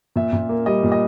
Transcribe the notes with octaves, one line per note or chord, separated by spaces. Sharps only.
A#2 E5
A#2
A#3
G3 D#5
A#2
D#5